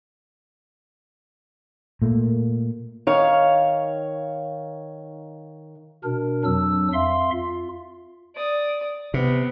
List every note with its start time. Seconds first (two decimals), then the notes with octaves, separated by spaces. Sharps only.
2.02 A#2 A3 A#3
3.07 D#3 C#5 F5
6.04 B2 D4 A#4
6.45 F2 F#3 D4 E6
6.93 F2 E5 F5 C6
7.32 F4
8.36 D5 D#6
9.14 C3 B3